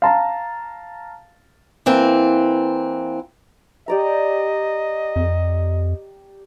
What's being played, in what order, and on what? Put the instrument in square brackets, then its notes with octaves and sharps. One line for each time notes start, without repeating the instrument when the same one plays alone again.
[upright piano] F5 A5 A#5
[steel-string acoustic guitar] E3 A#3 C4
[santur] G4 D5 A#5 [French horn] D#5
[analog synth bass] F2